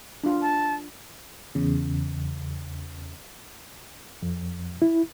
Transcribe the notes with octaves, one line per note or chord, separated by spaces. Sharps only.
D4 F4
A5
E2 C#3
F2
E4